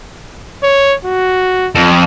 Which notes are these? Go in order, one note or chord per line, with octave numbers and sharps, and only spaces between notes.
C#5
F#4
F2